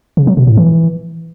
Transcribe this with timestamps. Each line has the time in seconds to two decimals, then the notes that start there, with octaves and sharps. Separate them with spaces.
0.17 C#3
0.27 F#3
0.37 B2
0.47 A2
0.57 E3